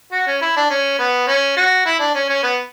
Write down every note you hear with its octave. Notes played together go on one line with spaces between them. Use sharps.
F#4
C#4
E4
D4
C#4
B3
C#4
F#4
E4
D4
C#4
C#4
B3